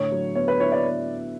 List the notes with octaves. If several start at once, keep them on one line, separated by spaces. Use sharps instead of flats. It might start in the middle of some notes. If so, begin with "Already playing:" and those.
Already playing: A2 D3 C#5
F#3
B3 C#5
B4
E4 C#5
D5